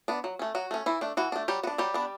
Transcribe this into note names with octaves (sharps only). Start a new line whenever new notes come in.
B3 D4
F#3
A3 C#4
F#3 F#4
A3 C#4
E3 E4
A3 D4
E3 F#4
A3 D4
F#3 G3 G4
B3 D4 F#4
F#3 G3 G4
B3 D4